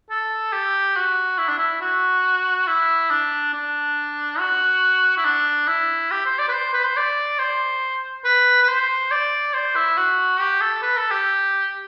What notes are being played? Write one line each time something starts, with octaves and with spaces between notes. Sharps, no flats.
A4
G4
F#4
E4
D4
E4
F#4
E4
D4
D4
F#4
E4
D4
E4
G4
C5
D5
B4
C5
B4
C5
D5
C5
B4
B4
C5
D5
C5
E4
F#4
G4
A4
B4
A4
G4